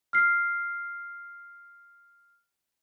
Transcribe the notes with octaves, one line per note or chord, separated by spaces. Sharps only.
F6 C7